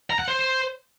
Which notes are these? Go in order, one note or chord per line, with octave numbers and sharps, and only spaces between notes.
A#5
F#5
C5